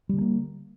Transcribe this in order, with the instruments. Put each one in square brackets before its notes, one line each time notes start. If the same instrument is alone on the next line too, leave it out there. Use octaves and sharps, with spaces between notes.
[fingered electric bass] G3
D3
G#3
A#3